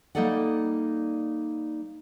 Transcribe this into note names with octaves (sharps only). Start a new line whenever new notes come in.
G3 A#3 D#4 A4 D5 F#5